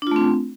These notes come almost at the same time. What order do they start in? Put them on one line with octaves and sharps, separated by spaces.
D4 F4 A3 C4